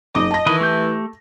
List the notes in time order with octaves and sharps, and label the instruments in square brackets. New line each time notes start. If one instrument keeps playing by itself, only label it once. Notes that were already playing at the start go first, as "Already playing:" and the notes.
[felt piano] F#1 D#4 D6 [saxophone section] D#5
[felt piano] A5 A#6
[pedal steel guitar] D#3 B4 D#5 [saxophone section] E3
[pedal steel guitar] A3 G4 G6